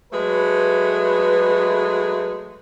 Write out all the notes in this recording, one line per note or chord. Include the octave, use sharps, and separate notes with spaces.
F#3 G#3 A3 B4